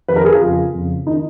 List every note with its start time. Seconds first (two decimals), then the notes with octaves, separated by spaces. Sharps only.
0.08 F2 D#3 B4
0.16 A#4
0.25 G#4
0.33 F4
0.41 F2 C#3
0.74 F2 C#3
1.06 D#3 D#4